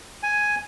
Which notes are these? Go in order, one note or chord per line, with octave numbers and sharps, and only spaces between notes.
G#5